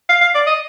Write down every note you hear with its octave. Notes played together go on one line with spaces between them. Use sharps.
F5
F5
D5
D#5